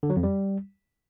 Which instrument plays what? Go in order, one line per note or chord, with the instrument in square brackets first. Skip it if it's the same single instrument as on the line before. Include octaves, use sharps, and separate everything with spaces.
[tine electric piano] D3
F#3
F2
G3